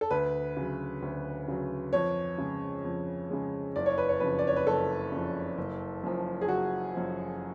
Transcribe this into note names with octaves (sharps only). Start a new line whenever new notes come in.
A4
D2 B4
C#3 F#3
D2
C#3 F#3
F2 C#5
C#3 G#3
F2
C#3 G#3
F#1 D5
C#5
B4
C#5
F2 C#3 B4
D5
C#5
B4
F#1 A4
F2 C#3
F#1
F#2 F3
G#4
F#1 F#4
F#2 F3